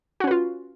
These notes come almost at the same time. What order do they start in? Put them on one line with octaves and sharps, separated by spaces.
F#4 C#4 B4 F4